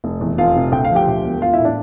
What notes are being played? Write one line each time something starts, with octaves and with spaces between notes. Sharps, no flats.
F1
E2
F1 F4 F5
C3
D2 G5
F5
F3
G4 G5
D2
E1
F4 F5
E4 E5
A2
D4 D5